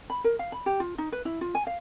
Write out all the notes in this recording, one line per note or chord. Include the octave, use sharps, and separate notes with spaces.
B5
A#4
F5
B5
G4
F4
D#4
B4
E4
F4
G#5
F5